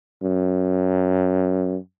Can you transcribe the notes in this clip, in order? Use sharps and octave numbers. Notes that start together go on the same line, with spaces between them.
F#2